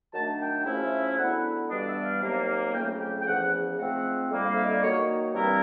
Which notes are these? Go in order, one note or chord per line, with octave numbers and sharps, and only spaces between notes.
D#3 F#3 A3 D4 A5
G5
C#3 F3 A3 C#4 E4
D3 F#3 B3 E4 F#5
G2 E3 G3 B3 D4 D#5
E5
F5
C3 D#3 F#3 A#3
F2 C#3 F#3 A3 G5
G5
G5
E2 C#3 F3 F#5
G#2 F3 A3 C4 F#5
F2 D3 G3 A#3
F5
E5
D#5
D5
D#3 F#3 A#3 D#4 C#5
G2 E3 G3 C4 E4 A#4